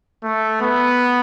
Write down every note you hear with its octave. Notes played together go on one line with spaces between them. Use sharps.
A3
B3